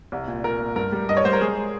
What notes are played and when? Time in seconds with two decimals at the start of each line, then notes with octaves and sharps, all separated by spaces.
0.12 C2
0.28 A#2
0.44 A#2 A#4
0.60 A#2
0.76 G2 A#4
0.92 G3
1.09 G2 D#5
1.17 C#5
1.25 G3 C5
1.33 A#4
1.41 G#3 G#4